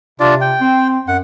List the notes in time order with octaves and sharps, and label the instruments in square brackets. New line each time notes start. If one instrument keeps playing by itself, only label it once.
[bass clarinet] C3 [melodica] D4 F4 D5
[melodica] G5
[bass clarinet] C4
[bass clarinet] F#2 [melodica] F#5